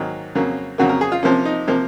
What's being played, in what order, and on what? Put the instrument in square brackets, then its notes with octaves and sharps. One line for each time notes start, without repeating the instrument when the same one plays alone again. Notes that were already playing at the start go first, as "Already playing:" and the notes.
Already playing: [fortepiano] G#2 D#3 F#3 A#3
F2 C#3 F#3 A#3
F2 C#3 F#3 A#3 F#4
A#4
G#4
F4
C3 F3 A#3 C#4
D#4
C3 F3 A#3